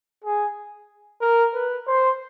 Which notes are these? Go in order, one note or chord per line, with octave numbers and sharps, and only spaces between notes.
G#4
A#4
B4
C5